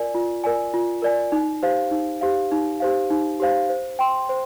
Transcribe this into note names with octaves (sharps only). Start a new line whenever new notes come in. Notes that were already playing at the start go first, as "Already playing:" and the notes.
Already playing: F4 A#4 D5 G#5
F4
A#4 D5 G#5
F4
A#4 D5 G#5
D#4
G4 C5 F5
D#4
G4 C5 F5
D#4
G4 C5 F5
D#4
G4 C5 F5
C5
G5 C6
C5